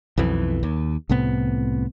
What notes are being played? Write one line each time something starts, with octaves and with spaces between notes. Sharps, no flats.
B1 F2 E3
D#2
C2 A2 C3 B3